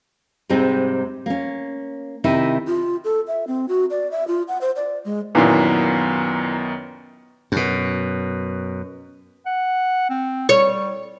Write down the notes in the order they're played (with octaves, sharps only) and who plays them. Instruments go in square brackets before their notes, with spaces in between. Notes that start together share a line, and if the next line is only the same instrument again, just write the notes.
[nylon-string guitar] G#2 C3 G3 G#3 C4 D#4
A#3 C#4
C3 D#3 D#4 E4
[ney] F4
A4
E5
C4
F#4
D5
E5
F4
F#5
C5
D5
G#3
[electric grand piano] F#2 D#3 B3 [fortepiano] A#2 E3
[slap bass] F#2 B2
[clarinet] F#5
C4
[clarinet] G3 [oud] C#5